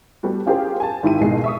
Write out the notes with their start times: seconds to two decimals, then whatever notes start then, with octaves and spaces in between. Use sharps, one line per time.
0.23 G3 A3 B3 F#4
0.46 C#4 F4 G4 G#4 A#4 C5
0.80 G#5 A5
1.03 G#1 D#3 E3 E4 G4 D#7
1.20 G#1 C#2 G#2 B2 G#4 C7
1.44 E5 C#6 D#6